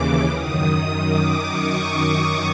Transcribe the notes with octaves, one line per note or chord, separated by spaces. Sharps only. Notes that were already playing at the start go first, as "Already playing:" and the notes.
Already playing: D#2 C#3 E3 D6
F#2 D#3 D#6
D6
C#6